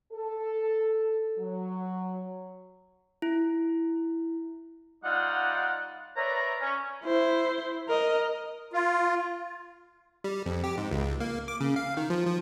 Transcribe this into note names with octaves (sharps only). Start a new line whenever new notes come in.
A4
F#3
E4
G3 D#4 F4 D5 F5 F#5
A#4 B4 C#5 D5 E5 A#5
C#4
E4 C5
A#4 D#5
F4
G3
F2
G4
G#2
C#2
A#3
D6
C#3
F5
D#3
F3
F3